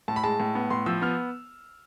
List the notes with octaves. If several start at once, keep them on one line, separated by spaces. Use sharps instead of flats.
A2 A5
B5
G#3 A5
A2
B3
A2 C6
F3 E6
B3 F6